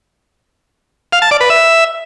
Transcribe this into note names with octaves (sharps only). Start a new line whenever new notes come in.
F5
A5
D5
B4
E5